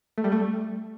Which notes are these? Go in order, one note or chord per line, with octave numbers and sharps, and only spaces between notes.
A3
G3
A3